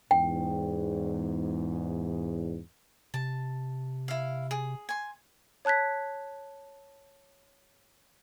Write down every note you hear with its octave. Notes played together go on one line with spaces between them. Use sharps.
E2 G#2 G5
C3 A5
E4 F5
G#4
G#5 C6
C#5 A5 F#6 G#6 B6